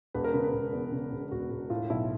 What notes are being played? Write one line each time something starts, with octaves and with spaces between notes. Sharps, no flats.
E1 B4
A#4
C#3 B4
B4
E1
E2
C#3
E1
E1 F#4
E1
A2 F4
B1 E4